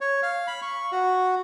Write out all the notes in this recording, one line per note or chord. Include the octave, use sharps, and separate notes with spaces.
C#5
F5
B5
C#6
F#4